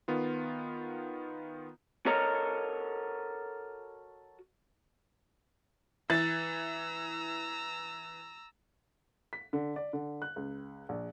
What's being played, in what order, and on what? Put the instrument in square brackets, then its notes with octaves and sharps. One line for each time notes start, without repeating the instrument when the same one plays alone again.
[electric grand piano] D#3 B3 F4
[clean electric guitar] F#4 A4 A#4 C#5 D#5
[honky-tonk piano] E3 [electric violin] A#5 E6 [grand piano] A6
[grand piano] B6
D3
D5
D3
F#6
C#2
A#1